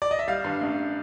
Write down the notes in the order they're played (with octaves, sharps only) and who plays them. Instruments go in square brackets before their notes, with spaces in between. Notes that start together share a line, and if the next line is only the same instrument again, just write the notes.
[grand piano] D5
D#5
E5
[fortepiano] G3 [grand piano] F5
[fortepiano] G2
A1